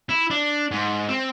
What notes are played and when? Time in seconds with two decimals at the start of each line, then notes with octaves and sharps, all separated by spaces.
0.09 E4
0.30 D4
0.71 G#2
1.09 C4